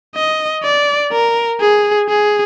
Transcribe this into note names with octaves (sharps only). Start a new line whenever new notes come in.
D#5
D5
A#4
G#4
G#4